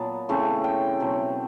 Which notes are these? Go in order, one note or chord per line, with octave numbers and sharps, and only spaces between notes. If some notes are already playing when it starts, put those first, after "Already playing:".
Already playing: A#2 F#3 B3 A5
C#3 E3 A3 C4
G5
B2 F#3 A3 C4